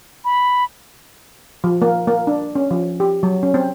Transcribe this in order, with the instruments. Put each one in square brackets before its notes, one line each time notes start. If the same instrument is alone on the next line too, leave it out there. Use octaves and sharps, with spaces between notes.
[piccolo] B5
[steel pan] F3
A#3
A#3
D4
C#4
F3
G4
F#3
C#4
C4